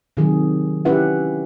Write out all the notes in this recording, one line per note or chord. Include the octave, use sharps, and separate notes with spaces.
C3 D#3 F#3 G#4
C#4 E4 G4 B4 E5 F#5